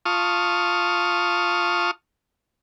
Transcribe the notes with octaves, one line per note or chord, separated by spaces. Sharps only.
F4 A5 C#6 D#6 F6